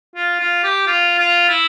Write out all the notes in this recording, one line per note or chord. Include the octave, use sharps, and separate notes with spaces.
F4
F4
G4
F4
F4
E4